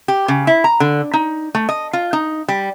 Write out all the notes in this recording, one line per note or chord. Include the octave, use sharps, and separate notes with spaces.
G4
C#3
E4
A#5
D3
D#4
A3
D#5
F4
D#4
G3